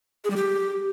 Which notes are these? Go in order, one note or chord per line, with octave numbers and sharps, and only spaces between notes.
G#4
G3
G4